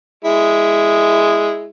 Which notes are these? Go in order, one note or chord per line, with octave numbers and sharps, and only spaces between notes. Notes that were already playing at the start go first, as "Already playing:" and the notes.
G#3 E4